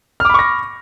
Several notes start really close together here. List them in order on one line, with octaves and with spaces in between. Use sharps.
F6 D6 B5 C#6 A#6